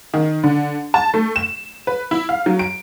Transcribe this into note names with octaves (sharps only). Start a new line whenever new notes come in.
D#3
D3
A5
A3
E7
B4
E4
F5
F#3
D7